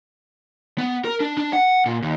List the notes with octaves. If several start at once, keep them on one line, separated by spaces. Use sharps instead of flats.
B3
A#4
D4
D4
F#5
A#2
D#2